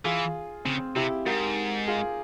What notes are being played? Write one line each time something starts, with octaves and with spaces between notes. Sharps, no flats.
E3 F4 G#4
C#3 C4
C3 E4 G4
G#2 G4 A#4
F4 G#4